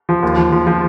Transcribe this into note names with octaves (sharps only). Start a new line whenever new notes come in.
F3
D#2
F3
F3
F3